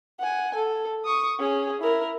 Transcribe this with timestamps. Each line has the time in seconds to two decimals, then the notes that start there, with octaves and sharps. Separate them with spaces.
0.19 F#5 G#5
0.55 A4
1.05 C#6 D#6
1.39 C#4 G#4
1.82 E4 A#4